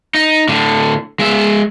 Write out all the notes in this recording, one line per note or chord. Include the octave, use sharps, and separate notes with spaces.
D#4
A2 D3
G#3 E5